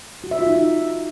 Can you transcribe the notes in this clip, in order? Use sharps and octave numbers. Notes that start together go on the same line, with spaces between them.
F#4
E5
F4
D#4